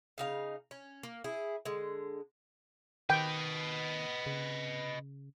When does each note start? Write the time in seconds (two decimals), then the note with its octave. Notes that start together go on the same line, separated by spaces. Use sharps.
0.18 C#3 D#4 F5
0.71 C#4
1.03 A#3
1.24 E4 G#4
1.65 D3 G#3
3.10 D#3 B4 D#5 G5
4.26 C#3